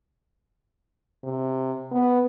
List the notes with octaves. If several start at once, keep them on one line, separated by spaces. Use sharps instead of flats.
C3
B3